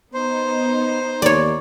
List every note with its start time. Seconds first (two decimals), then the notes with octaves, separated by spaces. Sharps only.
0.14 B3 D#4 C5
1.22 D#2 C#5 D5